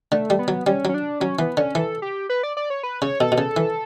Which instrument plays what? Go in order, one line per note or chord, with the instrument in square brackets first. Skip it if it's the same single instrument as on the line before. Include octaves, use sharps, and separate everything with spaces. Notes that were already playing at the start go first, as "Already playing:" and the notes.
[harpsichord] D3 [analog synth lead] A3
[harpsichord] G3
[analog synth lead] B3
[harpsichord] F#3
[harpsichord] G3 [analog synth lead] C#4
[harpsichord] F#3 [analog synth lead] C#4
[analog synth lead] D4
[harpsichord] F#3 [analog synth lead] C#4
[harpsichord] E3 [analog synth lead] B3
[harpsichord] D3 [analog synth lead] C#4
[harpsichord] E3 [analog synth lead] A4
[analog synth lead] G4
B4
D5
D5
C#5
B4
[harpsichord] C#3 [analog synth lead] C#5
[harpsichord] B2 [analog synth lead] A4
[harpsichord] B2
C#3
E3